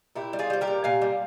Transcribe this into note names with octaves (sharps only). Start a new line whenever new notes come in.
A#2 E4 G4
G3
F4 G#4
G3 C5
G4 A#4
A#2
A#2 F5 G#5
G3